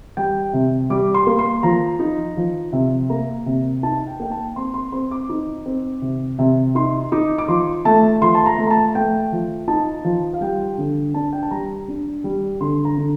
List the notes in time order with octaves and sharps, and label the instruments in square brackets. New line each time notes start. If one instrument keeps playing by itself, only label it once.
[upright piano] G3 G5
C3
G3 D6
C6
A#3
C6
F3 A#5
D#4
F3
C3
A#3 A#5
C3
D#4 A5
G5
A#3 G5
A5
C4 C6
C6
C4 C6
D6
D#4
C4
C3
C3
D#4 C6
D#4 D6
D6
F3 C6
A3 A5
F3 C6
A5
A#5
A3
A#5
A5
A3 G5
F3
D#4 A5
F3
F5
G3 G5
D3
D4 A5
G5
A5
G3 A#5
D4
G3
D3 C6
A#5
D3